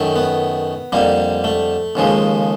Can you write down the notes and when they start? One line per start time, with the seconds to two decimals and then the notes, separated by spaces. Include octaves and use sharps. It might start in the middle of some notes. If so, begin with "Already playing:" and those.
Already playing: F#2 D#3 F#3 A3
0.16 B3
0.92 F2 D3 G3 A#3
1.44 A3
1.95 D#2 C#3 F3 G#3